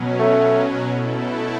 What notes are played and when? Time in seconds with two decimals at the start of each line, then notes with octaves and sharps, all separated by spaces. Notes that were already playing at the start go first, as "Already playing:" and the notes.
Already playing: B2 F#3 C#4
0.19 A3
0.87 B2 A3 E4 A4